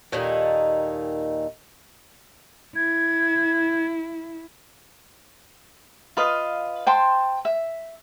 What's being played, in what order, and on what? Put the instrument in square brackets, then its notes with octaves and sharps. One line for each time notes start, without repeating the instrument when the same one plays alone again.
[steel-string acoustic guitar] D#2 A#2 D#3 D#4 A4 G#5
[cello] E4 [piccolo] G#6
[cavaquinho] F4 B4 D#5 F5
C5 G5 A5 C6
E5